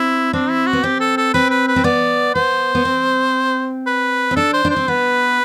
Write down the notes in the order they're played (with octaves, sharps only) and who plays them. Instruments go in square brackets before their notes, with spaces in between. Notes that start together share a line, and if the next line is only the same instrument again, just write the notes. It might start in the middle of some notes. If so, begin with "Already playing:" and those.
Already playing: [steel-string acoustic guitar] C4 [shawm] E4
[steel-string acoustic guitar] C4 [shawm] D4
[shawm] E4
F#4
[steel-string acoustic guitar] B3
[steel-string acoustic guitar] C4 [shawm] G4
[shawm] A4
A4
[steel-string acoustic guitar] C4 [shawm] B4
[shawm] B4
B4
[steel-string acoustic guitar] C4
[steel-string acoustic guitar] B3 [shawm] D5
[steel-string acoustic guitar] B3 [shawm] C5
[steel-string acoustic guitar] B3
C4
[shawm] B4
[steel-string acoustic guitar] C4
[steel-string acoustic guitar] D4 [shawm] A4
[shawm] C5
[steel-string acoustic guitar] D4
[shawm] C5
[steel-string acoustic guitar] C4
[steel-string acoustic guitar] B3 [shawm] B4